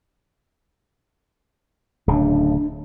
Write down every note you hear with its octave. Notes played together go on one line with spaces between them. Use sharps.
D1 C#3 D4